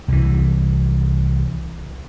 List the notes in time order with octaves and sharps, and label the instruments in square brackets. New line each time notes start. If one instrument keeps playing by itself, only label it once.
[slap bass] C2 E3